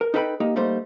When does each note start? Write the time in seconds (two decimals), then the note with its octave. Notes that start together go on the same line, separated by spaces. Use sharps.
0.01 A#4
0.14 D#4 A4 B4 E5 G5 B5
0.40 A#3 D#4 G4
0.56 G3 A3 A#3 D#4 C5